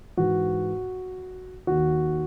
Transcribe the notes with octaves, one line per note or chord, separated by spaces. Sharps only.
G#2 E3 F#4
D#2 D#3 F#4